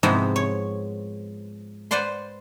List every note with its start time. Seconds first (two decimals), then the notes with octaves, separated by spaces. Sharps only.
0.03 G#2 C3 F3 B3 E4 A#5
0.36 C#5
1.91 B4 C5 D5 F#5 C6